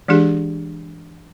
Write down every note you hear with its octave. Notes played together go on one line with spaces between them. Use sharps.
E3 G#3 D4 G4 G#4